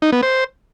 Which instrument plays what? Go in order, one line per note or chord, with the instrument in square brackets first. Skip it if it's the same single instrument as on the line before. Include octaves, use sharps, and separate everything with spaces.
[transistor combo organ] D#4
B3
C5